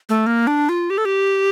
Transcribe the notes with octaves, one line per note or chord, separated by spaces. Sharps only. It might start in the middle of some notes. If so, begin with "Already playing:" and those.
A3
A#3
D4
F4
G4
A4
G4